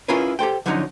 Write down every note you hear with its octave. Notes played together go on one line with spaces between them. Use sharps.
C#4 E4 F4 G#4 A#4 B4
G4 A4 C5 G5
D3 F3 F#3 C#4 D#4